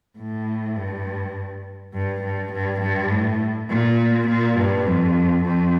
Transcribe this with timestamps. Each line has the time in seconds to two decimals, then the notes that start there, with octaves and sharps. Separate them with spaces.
0.18 A2
0.77 G2
1.94 G2
2.24 G2
2.53 G2
2.82 G2
3.11 A2
3.70 A#2
4.28 A#2
4.58 G2
4.86 F2
5.45 F2